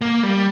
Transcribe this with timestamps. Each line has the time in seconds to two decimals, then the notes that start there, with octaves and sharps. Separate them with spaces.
0.01 A#3
0.23 G3